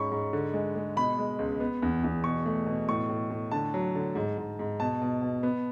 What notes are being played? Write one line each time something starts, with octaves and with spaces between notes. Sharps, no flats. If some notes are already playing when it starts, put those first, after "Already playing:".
Already playing: G#2 C#4 B5 C#6
G#2
D3
G#3
G#3
B2 B5
G#3
C#2
B3
E2
E2
B2 C#6
A3
B2
A2 C#6
A2
A2
D3 A5
F#3
D3
G#2
G#2
G#2
B2 A5
B2
B2
B3